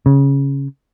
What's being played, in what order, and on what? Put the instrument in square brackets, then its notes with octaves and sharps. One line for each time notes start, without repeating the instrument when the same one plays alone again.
[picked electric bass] C#3